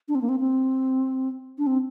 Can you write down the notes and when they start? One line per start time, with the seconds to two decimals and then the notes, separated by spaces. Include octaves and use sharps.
0.08 D4
0.15 C4
0.21 A#3
0.29 C4
0.40 C4
1.58 D4
1.67 C4